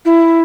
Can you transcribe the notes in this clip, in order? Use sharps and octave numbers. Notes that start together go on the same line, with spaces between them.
E4